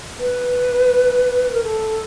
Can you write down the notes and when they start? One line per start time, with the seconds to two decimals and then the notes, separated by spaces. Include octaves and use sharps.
0.20 B4
1.53 A#4
1.64 A4